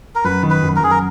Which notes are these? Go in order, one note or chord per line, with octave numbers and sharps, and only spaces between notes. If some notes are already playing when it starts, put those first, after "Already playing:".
A#4
F#2 B4
D#3
B4
F#2
A#4
F#2 G#4
A#4